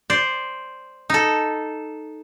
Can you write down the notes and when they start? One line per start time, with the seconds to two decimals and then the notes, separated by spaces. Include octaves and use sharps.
0.10 C5 D5
1.10 D#4 A4